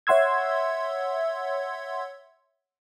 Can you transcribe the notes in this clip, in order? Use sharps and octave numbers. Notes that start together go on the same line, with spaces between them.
C#5 E5 F#5 C6 E6 G#6